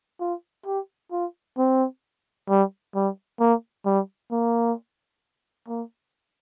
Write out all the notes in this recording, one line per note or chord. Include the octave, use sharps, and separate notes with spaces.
F4
G4
F4
C4
G3
G3
A#3
G3
A#3
A#3